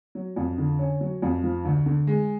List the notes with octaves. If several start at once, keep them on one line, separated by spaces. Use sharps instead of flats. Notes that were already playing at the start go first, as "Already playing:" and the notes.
F#3
F2
D3
C#4
F#3
F2
F3
D2
D3
G#3